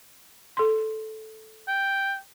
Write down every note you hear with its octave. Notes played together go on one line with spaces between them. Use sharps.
A4 C6
G5